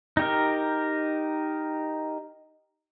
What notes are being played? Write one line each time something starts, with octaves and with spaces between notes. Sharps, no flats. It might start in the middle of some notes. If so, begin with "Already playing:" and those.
D#4 G4 A#4